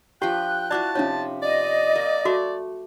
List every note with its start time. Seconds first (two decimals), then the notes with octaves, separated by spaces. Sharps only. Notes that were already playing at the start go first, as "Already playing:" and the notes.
0.22 F3 D4 G4 B4 G5 F#6
0.71 E4 F#4 D5 F5 A5 D6
0.95 C3 F3 C#4 D#4 C#5
1.42 D5 D#5
1.96 A#3
2.25 A3 F#4 D6